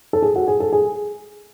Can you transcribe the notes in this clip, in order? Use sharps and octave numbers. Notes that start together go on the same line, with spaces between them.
A4
G#4
F#4
G#4
A4
G#4